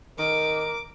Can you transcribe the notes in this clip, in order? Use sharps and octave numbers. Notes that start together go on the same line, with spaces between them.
D#3 A#4 D6